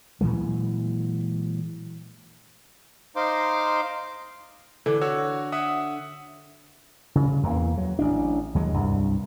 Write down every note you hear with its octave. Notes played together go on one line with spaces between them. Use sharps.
A#2 E3 F#3 G#3
D#4 C5 F5 C6 D6
D3 E3
F#4 C#5 E6
E5 F#5 D#6
C#3
E2 E3 A#3
F#3
A1 D4
D#2 F#3 G#3
C2 G2